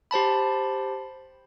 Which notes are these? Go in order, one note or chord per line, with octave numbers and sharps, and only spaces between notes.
G4 C5 A5 B5